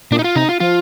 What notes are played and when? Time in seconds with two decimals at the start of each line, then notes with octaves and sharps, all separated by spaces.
0.11 A#2 D4
0.19 D#4
0.24 F4
0.35 C3 D#4
0.49 F4
0.60 F3 F4